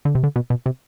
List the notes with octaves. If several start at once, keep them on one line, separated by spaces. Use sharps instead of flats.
D3
C3
D3
B2
B2
C3